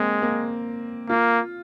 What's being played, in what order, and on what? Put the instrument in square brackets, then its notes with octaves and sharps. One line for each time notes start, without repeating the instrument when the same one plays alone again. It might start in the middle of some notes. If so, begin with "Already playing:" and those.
Already playing: [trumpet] G#3 [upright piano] A#3 C4
[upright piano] A#3
[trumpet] A#3 [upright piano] F4